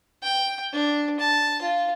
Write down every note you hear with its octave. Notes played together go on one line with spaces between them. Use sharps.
G5
D4
A5
F4